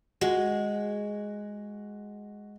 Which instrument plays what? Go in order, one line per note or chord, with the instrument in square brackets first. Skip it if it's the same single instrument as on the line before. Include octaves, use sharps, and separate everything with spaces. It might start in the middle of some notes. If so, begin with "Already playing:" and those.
[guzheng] G#3 [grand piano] F#4